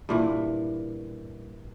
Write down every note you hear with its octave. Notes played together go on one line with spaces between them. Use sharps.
G2 A#2 E3